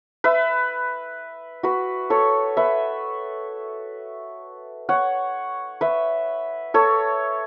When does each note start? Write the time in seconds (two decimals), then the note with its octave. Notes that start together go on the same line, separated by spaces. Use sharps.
0.24 B4 E5
1.63 F#4 B4
2.10 A4 C#5
2.57 B4 E5
4.89 C#5 F#5
5.81 B4 E5
6.74 A4 C#5